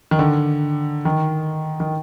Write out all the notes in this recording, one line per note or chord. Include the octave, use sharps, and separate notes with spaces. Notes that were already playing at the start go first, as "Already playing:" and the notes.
D#3
D3
D#3
D#3